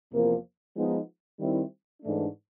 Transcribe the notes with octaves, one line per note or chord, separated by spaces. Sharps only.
E2 C3 F3 A#3
F3 G#3 B3 D#4
D#3 G3 C4 E4
G#2 E3 A3 D4